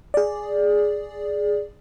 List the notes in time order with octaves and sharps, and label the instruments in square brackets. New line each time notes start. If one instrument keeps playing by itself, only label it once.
[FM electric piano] G#4 D5